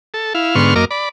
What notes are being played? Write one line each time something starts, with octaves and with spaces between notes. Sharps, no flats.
A4
E4 F5
G#2 D3 B3 C6 C#6 F6
F#2 A#3 A#4 D#5 D6 F6
D5 B5